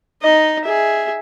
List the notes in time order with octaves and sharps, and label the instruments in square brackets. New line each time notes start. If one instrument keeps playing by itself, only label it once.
[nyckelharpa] D#4 D#5
G#4 E5